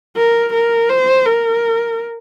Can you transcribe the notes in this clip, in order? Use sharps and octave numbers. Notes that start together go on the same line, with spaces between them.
A#4
A#4
C5
A#4